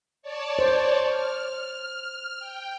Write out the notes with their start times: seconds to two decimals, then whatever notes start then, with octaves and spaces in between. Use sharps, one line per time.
0.22 C#5 D5 A5
0.59 C5
1.07 F6
2.40 G5